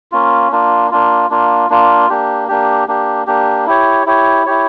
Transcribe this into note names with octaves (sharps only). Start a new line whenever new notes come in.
A#3 C#4 F4
A#3 D4 F4
A#3 D4 F4
A#3 D4 F4
A#3 D4 F4
A#3 D4 G4
A#3 D4 G4
A#3 D4 G4
A#3 D4 G4
E4 G4 C#5
E4 G4 C#5
E4 G4 C#5